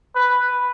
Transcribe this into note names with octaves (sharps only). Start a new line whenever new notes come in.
B4